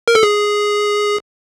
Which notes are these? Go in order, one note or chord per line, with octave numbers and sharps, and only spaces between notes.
A#4
A4
G#4